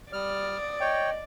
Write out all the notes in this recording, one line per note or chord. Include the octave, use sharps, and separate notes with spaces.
G3 D5 D#6 F6
C#5 D#5 G5